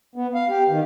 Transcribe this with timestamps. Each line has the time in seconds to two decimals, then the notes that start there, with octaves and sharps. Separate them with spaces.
0.16 B3
0.35 F5
0.49 G4
0.69 D#3